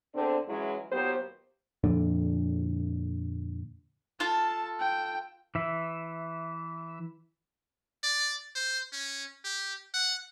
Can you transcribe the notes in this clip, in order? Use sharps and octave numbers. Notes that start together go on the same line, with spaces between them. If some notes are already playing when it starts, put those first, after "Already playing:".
E2 D3 C4 D4 C5 D5
E3 F#3 G#3 C#4 E4
D#2 A#2 F#3 B3 G4 C5
F2 A#2 D3
F4 A4 A5
G5
E3 E5
D5
C5
C#4
G4
F#5